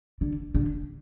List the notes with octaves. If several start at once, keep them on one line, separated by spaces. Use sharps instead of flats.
D3
D3